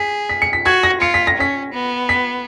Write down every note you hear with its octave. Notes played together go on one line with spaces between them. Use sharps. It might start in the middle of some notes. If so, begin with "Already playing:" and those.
Already playing: G#4 B6
B6
C#7
B6
F#4 G#6
A#6
F4 C#7
B6
A#6
C#4 B6
B3
B6